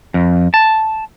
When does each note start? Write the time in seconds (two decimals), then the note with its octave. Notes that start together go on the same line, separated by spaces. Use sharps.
0.14 F2
0.54 A5